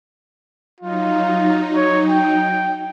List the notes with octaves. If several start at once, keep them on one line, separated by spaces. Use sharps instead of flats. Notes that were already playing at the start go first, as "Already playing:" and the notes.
F#3 D#4 F4
C#5
G5